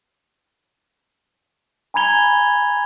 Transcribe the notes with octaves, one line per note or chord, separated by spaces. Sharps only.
G#5 A#5 B5 G#6 F7 G7